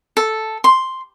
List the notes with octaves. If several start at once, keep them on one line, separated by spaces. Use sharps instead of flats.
A4
C6